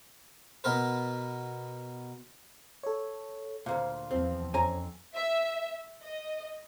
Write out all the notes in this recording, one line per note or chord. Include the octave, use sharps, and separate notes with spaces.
B2 B3 A#4 B4
A4 C#5
D2 G2 A#2 C5 F5
E2 F3 C4
F2 C#4 C5 G#5 A#5
E5
D#5